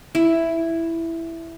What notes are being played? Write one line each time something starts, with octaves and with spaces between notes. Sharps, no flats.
E4